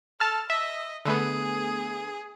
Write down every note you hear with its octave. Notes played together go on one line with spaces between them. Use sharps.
A4 A5 F6
D#5 E5
D3 A3 B3 G#4